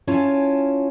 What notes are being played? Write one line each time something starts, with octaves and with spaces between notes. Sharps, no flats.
C#4 E4 F4 C#5 G#5 A5